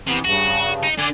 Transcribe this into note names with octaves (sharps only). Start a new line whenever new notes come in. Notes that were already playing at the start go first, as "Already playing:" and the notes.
C3 E3 B3
G2 C#3 F#4
D#4
D3 D5 G#5